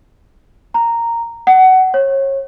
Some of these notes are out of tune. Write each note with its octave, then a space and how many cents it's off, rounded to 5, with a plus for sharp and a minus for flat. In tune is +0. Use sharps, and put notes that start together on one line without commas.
A#5 -10
F#5 +20
C#5 -30